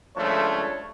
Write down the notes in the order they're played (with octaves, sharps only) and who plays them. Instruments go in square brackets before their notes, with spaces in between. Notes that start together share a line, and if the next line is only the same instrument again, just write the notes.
[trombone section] C#2 F3 A3 [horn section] G2 D4 C#5